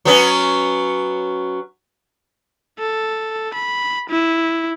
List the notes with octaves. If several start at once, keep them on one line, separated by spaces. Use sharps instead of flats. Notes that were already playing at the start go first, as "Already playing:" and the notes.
F#3 B3 C#4
A4
B5
E4